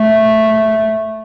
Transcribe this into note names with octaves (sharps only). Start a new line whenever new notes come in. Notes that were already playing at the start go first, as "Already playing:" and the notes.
Already playing: A3